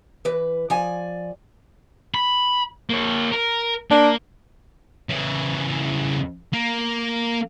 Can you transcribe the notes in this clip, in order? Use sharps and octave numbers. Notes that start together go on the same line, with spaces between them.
E3 B4
F3 D5 G#5
B5
A#3 C#5
A#4
A#3 D4
C#3 E3
A#3